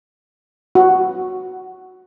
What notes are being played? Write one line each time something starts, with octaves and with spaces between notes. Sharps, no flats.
F#4